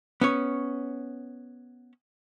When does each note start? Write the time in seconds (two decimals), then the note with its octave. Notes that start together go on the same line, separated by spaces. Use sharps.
0.21 B3 C#4 C#5